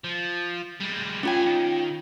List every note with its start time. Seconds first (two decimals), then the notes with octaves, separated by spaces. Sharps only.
0.04 F3
0.80 G3 G#3
1.23 A3 C#4 F4 G5 G#5
1.46 D#3